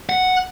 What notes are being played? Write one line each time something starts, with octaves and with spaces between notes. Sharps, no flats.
F#5